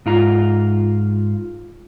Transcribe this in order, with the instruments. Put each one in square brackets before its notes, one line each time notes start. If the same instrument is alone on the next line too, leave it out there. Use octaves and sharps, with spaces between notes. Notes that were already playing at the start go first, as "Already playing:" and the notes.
[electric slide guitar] G#2 F4 A#5